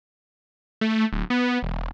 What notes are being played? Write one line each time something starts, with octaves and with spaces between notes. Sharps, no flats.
A3
D1
B3
E1